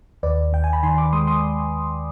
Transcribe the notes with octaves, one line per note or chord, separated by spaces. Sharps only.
D#2 B4 D5
D#2 G5
G#5
B5
D#3 G#5 C6
B5 D6
G#3 C6 D#6
C6 D#6